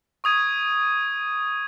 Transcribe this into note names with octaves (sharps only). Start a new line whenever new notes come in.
C#6 D#6 G#6 D#7